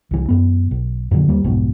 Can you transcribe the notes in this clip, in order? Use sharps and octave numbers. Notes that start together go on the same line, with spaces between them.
C2 E3
F#2 B3
B1
F2 A#2 D3 F#3
D#2 G3 A#3
B1 F2 G#2 B2